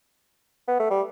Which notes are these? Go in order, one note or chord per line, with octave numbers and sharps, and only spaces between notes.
B3
A3
G3